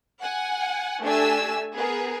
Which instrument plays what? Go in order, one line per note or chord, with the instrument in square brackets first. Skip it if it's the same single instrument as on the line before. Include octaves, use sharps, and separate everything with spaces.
[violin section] F#5 G#5
A3 D4 G4 G#5 E6
B3 G#4 A#4